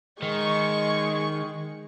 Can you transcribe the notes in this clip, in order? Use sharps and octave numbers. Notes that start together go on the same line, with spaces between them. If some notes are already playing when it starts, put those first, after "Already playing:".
D#3 G#3 C#6